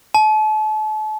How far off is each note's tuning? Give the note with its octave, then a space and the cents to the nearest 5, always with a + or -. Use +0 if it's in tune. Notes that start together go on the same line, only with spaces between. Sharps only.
A5 -35